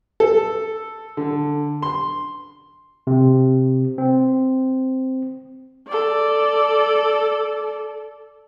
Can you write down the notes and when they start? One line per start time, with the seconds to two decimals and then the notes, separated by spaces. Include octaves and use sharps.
0.20 A4
1.17 D3
1.83 C6
3.07 C3
3.98 C4
5.87 A4 D5